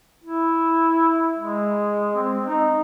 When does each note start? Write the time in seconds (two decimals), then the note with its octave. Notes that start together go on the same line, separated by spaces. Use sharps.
0.24 E4
1.37 G#3
2.16 C4
2.47 D#4